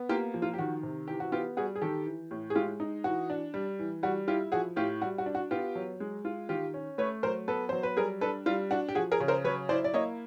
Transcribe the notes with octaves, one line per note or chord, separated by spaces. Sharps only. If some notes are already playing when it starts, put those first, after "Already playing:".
Already playing: B3
A#3 F4 G4
F3
F4
G4
D#3 F#4
C3
E3 G4
F#4
B3 F4 G4
G3 F#4 G#4
G#4
D#3 G4 A4
E3
A2
G#4
G#3 F4 G4
D#4
E3 F#4
D4
G3
E3
G3 F#4
E4 F4 G4
F3 F#4 G#4
A2 F4 G4
G3 F#4
F#4
D4
F#4
B3 F4 G4
F#3
G#3
F4
D#3 F4 G4
C#4
A3 B4 C#5
F#3 A#4 C5
B3 A4 B4
F#3 C5
B4
G3 G#4 A#4
D4 A4 B4
G3 F4
D4 F#4
G4
F3 F#4 G#4
G#4 A#4
C#3
A#4 C5
F#3 B4 C#5
E4 C5 D5
D5
A#3 C#5 D#5